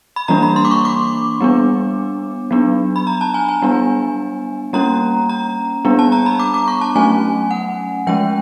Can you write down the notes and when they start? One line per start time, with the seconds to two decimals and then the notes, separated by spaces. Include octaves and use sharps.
0.16 B5
0.28 E3 G3 A#3 D4 A#5
0.42 B5
0.56 C6
0.65 D6
0.71 C#6
0.85 D6
1.41 G3 B3 D4
2.51 F#3 B3 D4
2.96 B5
3.07 A#5
3.21 A5
3.34 G#5
3.49 G#5
3.62 G3 B3 D4
4.73 G3 A#3 C#4 A#5
5.29 A#5
5.85 G3 B3 D4
5.99 A5
6.12 A#5
6.26 B5
6.39 D6
6.54 D6
6.68 C#6
6.81 A5
6.96 F#3 A3 C#4 G#5
7.51 F#5
8.07 F3 G#3 C#4 G5